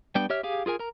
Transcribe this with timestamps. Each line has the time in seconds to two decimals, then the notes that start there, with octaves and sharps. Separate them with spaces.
0.15 G3 B3 D4 G5
0.30 G4 C#5 E5 F6
0.43 G4 G#4 F5
0.66 F4 G#4 A#4 G#5
0.80 A#4 A#5